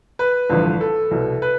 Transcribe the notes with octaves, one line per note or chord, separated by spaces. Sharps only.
B4
A1 G2 D3 F3
A4
C2 B2
B4